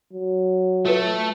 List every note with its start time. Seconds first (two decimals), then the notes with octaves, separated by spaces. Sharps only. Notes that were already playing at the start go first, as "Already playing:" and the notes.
0.13 F#3
0.85 A3 F4 B4